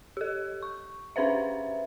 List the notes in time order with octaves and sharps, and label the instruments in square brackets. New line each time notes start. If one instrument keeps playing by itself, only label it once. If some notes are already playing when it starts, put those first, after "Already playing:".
[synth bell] G4 A4
C#6
C#4 D4 B4 C5 E5